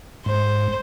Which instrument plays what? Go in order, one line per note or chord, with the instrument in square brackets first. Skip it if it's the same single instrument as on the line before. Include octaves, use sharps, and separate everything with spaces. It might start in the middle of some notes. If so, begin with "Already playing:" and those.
[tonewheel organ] G#2 [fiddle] C5